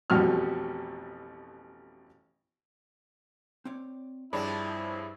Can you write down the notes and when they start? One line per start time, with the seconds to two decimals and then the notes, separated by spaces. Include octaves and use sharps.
0.10 A1 F2 B2 G3 F#4 F6
3.65 C4 C#5 D5
4.33 G2 F3 C4 D4 E4 G#4 C#5 B5